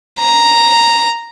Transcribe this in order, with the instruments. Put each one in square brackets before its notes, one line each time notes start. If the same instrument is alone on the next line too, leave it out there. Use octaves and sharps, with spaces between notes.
[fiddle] A#5